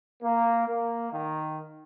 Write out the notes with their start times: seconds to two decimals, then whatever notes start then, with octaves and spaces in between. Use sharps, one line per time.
0.22 A#3
0.68 A#3
1.12 D#3